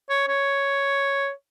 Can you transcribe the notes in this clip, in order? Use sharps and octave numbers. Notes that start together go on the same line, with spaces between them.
C#5
C#5